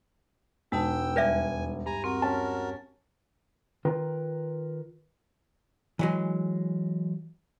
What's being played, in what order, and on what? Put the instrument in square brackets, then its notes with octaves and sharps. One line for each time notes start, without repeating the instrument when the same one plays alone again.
[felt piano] E1 [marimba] G#3 D#4 A5 [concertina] G5 E6
[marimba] D#2 G3 [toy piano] B4 D5 E5 [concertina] G#5
[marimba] G2 [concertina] G#5 A#5
[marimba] C4 [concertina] F#4 A#4
[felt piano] C#4 A5
[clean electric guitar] D#3 F4 A#4 B4 G5
[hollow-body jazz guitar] E3 F#3 G#3